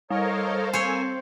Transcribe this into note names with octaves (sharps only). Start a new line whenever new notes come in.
G3 A4 A#4 C5 C#5 D#5 F5
A#3 C4 C5 C#5 G#5 E6